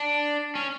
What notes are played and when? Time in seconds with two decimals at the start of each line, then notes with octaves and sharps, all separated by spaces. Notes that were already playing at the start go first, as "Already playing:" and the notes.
Already playing: D4
0.55 C#4